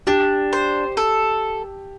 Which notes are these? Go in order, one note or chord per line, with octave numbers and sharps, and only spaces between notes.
D4 G4
C5
A4